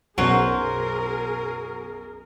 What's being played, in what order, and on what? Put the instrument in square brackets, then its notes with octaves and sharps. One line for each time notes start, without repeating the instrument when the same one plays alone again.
[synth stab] B1 F#2 B2 [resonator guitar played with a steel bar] F#3 C5 [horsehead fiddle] G#4 A#4